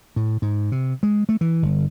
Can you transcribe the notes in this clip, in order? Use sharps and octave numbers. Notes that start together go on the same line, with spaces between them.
A2
G#2
C3
G#3
A3
E3
G1